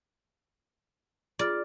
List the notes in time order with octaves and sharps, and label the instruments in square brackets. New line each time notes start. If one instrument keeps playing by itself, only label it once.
[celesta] F4 G#4 F6 [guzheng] D5